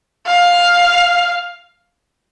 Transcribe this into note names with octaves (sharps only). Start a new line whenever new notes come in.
F5